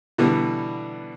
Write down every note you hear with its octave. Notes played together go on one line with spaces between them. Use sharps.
B2 D3 E3 G3 B3